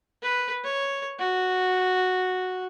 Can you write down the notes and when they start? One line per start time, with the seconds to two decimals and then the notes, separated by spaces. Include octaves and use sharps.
0.23 B4
0.64 C#5
1.19 F#4